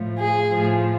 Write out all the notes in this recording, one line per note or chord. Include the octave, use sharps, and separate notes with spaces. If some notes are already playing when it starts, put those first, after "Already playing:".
Already playing: A2 F3
G#4
A2 F3